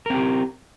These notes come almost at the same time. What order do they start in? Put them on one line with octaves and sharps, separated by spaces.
A#4 C4 G4